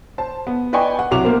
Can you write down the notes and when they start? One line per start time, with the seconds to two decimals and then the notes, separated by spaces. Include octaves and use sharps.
0.18 C5 A5
0.47 B3
0.73 B4 D5 D#5 G5 G#5 C#6
0.99 F#5
1.11 C2 F#3 F#4 D6 F7
1.24 A#3 B3 A#4 C5